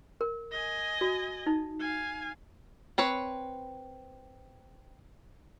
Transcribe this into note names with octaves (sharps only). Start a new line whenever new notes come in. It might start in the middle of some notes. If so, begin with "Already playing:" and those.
A#4
D#5 G#5
F#4
D#4
F5 G#5
C4 B4 C#5